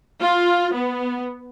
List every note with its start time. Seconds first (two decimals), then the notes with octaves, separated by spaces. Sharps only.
0.21 F4
0.75 B3